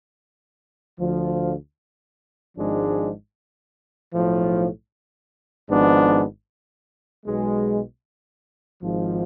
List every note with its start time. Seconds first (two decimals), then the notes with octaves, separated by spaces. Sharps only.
0.99 D2 D3 F3
2.56 G#1 G#2 F3 G#3 D4
4.12 B1 A2 F3
5.69 G#1 G#2 F3 B3 D4
7.25 B1 B2 G#3
8.81 G#1 G#2 F3